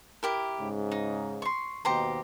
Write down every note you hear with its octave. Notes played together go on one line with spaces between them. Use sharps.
E4 G4 A#4
G#2 C#3
D#4
C6 C#6
D#2 B2 G4 C5 A#5